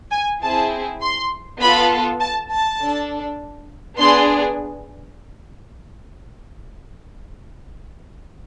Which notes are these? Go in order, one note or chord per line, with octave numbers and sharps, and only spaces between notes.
G#5
C4 E4 G#4 A5
C6
B3 F4 A4 B5
A5
A5
D4 A4
B3 D4 G#4 C6